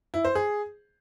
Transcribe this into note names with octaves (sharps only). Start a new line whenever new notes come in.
E4
C5
G#4